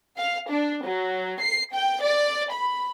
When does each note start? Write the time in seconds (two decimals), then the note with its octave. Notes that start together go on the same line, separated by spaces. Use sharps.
0.19 F5
0.51 D4
0.85 F#3
1.41 C7
1.74 G5
2.03 D5
2.51 B5